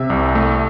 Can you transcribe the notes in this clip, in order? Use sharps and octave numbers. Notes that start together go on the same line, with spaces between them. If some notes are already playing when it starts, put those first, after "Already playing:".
Already playing: C3 E5
C2
A3